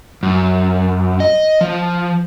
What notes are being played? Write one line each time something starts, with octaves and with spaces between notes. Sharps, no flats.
F#2
D#5
F3